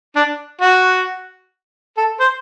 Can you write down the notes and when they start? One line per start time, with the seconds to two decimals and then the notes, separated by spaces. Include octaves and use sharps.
0.16 D4
0.61 F#4
1.97 A4
2.20 C5